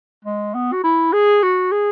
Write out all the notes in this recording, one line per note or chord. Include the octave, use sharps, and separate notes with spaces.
G#3
B3
F#4
E4
G#4
F#4
G#4